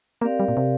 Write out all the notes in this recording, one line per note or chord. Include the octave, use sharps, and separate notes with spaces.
A#3 C4 G4 A#4 D5 F5
G3
A#2
C3